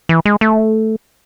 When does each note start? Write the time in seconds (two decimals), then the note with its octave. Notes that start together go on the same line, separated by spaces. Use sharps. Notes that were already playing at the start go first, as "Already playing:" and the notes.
0.09 E3
0.25 G#3
0.41 A3